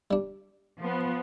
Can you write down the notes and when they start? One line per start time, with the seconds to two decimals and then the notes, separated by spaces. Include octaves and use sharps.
0.11 G3 D4
0.79 F3 B3